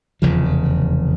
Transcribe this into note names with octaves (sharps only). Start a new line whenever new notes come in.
F1 E2 C#3 F3